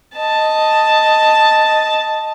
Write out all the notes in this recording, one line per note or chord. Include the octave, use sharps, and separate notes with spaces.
D#5 A5